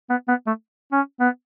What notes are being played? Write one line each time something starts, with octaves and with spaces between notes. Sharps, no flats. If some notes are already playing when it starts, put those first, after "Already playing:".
B3
B3
A3
C#4
B3